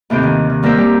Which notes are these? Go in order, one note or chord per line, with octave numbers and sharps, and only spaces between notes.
D#2 A2 C3 G5 G6
D#3
D#3
G3 A#3 A#4 C5 E5 G5
G3 G4